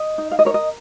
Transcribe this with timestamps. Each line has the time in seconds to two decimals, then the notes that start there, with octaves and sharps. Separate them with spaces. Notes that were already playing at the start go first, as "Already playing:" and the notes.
Already playing: D#5
0.18 D#4
0.31 F5
0.39 D#5
0.45 A#4 C#5
0.54 D#5